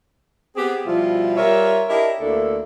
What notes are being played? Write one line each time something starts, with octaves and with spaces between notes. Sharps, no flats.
B3 C4 G4 G#4
B2 F3 G3 E4 F4
G3 F4 A#4 C#5 E5
D4 E4 G4 A#4 C#5 D#5
D2 A#3 D4 E4 A4